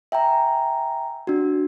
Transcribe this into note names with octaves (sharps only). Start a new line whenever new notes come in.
E5 G5 G#5 A#5
D4 F#4